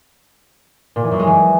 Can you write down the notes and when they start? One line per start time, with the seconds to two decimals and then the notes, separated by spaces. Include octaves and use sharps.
0.96 A#2
1.04 E3
1.11 F#2
1.19 G#3
1.27 E3